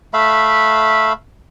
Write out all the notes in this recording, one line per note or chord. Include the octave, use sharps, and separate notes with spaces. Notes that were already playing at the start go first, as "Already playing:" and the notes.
A3 E5 F5 B5